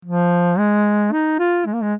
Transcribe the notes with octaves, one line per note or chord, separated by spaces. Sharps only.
F3
G#3
D#4
F4
G#3
A#3
G#3